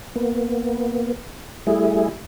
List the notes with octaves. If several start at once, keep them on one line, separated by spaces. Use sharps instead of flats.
A#3 B3
G3 A3 E4 G#4